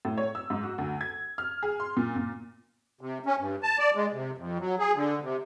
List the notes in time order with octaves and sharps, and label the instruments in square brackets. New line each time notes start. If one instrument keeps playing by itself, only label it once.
[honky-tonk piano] A2
C#5
E6
G#2
F#4
D2
G#6
F6
G#4
C6
A#2
A#2
[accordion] C3
C#4
G2
A5
D5
G#3
C3
F2
F#3
G#4
D3
C3